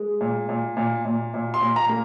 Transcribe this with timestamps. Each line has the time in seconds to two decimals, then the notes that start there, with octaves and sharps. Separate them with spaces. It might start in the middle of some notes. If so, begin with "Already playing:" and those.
Already playing: G#3
0.21 A#2
0.49 A#2
0.77 A#2
1.05 A#2
1.34 A#2
1.54 C6
1.61 A#2
1.76 A#5
1.89 A#3